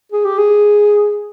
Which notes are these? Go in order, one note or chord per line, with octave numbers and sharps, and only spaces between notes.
G#4
G4
G#4